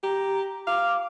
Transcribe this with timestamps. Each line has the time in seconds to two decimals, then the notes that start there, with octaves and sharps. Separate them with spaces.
0.03 G4 A#5
0.67 F5 D6